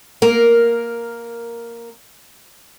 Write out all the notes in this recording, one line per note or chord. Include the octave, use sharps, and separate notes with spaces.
A#3 A#4